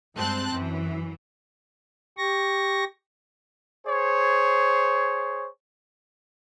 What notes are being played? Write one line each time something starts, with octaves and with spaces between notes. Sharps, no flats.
G2 G#3 C4 A5 F#6
F#2 E3
G4 C#6 A#6
G#4 C5 C#5